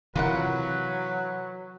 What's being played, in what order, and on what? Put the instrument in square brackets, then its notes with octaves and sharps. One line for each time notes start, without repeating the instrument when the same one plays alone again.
[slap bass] C3 E3 [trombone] F#3 [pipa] F4 A#4 F#5 [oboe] B4